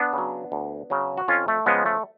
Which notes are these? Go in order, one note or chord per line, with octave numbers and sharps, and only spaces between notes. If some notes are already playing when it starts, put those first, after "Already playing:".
Already playing: B3 D4
C#3 F#3
D2
C#3 F#3
F#4
F2 C#4 F4
A3
C#3 F3 G#3 B3
A3